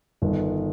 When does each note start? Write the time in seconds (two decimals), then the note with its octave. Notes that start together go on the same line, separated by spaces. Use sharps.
0.22 G1 G2 D#3